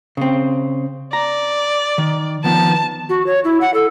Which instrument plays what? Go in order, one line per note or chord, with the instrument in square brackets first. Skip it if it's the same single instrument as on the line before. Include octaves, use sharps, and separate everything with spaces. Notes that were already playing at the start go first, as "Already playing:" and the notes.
[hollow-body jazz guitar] C#3 C4
[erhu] D5 [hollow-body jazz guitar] A#5
[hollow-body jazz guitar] D#3
[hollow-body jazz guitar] D#3 F3 B3 [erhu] A5
[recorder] F#4
C#5
E4
F#5
A4